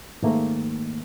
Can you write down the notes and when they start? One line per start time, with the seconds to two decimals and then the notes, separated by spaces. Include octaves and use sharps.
0.23 G#2 D#3 A3 A#3